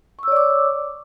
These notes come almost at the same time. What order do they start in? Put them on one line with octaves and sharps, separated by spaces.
C#6 E6 C#5 D5 D6